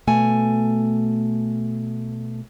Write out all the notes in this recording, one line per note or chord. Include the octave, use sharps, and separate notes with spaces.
B2 A3 G#5